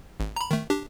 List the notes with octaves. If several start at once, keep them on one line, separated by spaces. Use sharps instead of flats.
G#1
A#5 B5
D#3 A3
D4 G4